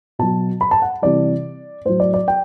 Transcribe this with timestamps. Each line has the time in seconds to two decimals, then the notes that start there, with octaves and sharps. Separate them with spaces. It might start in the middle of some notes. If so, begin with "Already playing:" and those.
0.19 B2 F#3 A5
0.61 B5
0.71 A5
0.82 F#5
1.02 C3 E3 G3 D5
1.85 A2 F#3 C5
2.00 D5
2.14 D5
2.28 G5